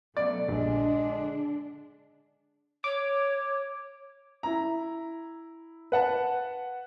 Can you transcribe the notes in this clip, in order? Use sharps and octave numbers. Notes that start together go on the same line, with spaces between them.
B2 F#3 A3 D5
A#1 G2 D3 G#3 D4
C#5 D6
E4 A#5
B4 F#5 A5